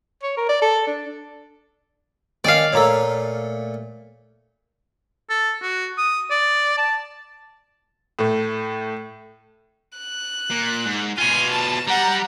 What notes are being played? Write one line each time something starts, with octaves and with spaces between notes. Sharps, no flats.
C#5
A#4
D5
A4
D4
D#3 C#4 D5 F5
A#2 A3 C#5 A#5 E6
A4
F#4
D#6
D5
A5
A2 A3
F#6
A#2
G#2
B2 F4 G#5
A5
G3 F#5 A#5